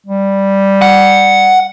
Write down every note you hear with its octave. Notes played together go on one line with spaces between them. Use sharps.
G3
F#5